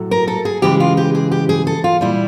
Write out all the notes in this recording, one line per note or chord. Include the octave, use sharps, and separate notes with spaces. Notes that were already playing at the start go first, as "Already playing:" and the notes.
Already playing: A2 F#3 A3
A#4
A4
G#4
C#3 E3 G#3 G4
F4
G4
G#4
G4
G#4
A4
F4
A#2 G3 E4